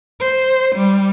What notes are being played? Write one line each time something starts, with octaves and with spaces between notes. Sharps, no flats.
C5
G3